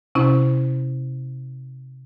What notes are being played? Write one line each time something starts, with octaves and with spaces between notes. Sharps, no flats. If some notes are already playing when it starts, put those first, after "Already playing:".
C3 C#4 E4